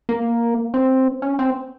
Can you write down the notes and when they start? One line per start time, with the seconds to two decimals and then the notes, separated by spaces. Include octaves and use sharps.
0.09 A#3
0.74 C4
1.22 C#4
1.39 C4